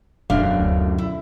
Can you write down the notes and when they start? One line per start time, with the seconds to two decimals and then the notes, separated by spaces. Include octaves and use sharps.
0.30 E1 F#2 B2 F#3 A3 D4 F5
0.60 D2
0.98 E4